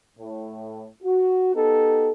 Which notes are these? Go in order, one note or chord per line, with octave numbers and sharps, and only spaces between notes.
A2
F#4
B3 D#4 G4 A4